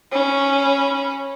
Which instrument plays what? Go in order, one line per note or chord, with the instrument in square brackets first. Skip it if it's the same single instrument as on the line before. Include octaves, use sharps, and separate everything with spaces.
[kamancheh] C#4 B5